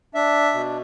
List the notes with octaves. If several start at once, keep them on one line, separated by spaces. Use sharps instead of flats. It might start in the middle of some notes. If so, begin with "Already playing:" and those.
D4 E5
B2